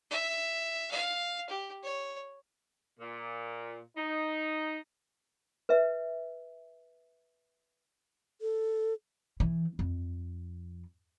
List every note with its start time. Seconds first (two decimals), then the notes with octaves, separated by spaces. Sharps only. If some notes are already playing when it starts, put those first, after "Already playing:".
0.11 E5
0.91 F5
1.50 G4
1.83 C#5
3.00 A#2
3.97 D#4
5.69 B4 E5
8.41 A4
9.40 E3
9.79 F2